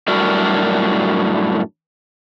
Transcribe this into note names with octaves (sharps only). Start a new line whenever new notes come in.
F#2 A2 G3 D4 F#4 A#4